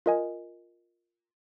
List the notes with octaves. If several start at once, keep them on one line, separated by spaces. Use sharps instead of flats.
F4 A#4 D#5 G#5